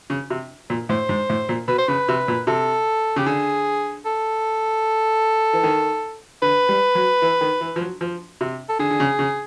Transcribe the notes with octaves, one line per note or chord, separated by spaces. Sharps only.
C#3
C3
A#2
A2 C5
G#2
A2
A#2
B2 B4
C5
C#3 B4
C3
A#2
C3 A4
C#3 G4
D3 G#4
A4
E3
D#3
D3 B4
G3
F#3
E3
D#3
E3
F3
F#3
F3
C3
A4
D3 G#4
D3
C#3
C#3